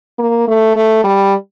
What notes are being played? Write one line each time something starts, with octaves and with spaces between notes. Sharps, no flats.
A#3
A3
A3
G3